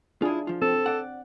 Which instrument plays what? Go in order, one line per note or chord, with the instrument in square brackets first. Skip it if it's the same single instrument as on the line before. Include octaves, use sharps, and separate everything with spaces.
[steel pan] D4 G#4 [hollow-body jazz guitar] E4 F4
[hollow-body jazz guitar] F3 F4
[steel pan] C4 [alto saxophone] A4
[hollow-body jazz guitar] D5 F#5